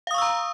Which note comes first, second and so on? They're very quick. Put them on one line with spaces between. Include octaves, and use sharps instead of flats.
F5 D#6 C#6 E6 A#5